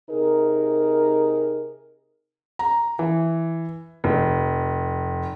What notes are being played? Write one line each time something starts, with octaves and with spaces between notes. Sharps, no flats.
C3 D#4 G#4 A#4
A#5
E3
F1